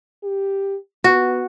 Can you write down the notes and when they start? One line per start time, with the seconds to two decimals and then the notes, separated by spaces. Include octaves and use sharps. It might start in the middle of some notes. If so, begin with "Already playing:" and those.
0.23 G4
1.04 B3 F#4